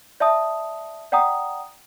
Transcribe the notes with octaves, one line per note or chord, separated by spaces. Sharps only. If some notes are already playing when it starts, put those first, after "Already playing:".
D5 E5 A5 D#6
D5 F#5 G5 A#5 D#6